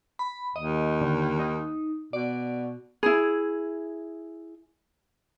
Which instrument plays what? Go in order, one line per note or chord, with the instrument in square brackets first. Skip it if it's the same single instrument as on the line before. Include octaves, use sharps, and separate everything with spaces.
[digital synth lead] B5
[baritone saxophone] D#2 [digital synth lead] D#5
[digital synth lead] D3
D#4
[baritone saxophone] B2 [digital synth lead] D5
[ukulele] E4 G#4